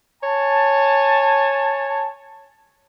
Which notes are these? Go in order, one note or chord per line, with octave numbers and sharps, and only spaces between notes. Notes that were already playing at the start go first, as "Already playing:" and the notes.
C#5 G#5 A5